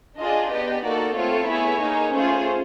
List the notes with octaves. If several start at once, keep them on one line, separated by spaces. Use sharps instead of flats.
D4 F4 G#4 D#5
B3 D4 G4 D#5
A#3 D#4 F#4 A4 D5
A3 C4 F4 A4 C#5
B3 E4 G#4
A#3 D#4 G#4
A3 C#4 F4 G#4 C5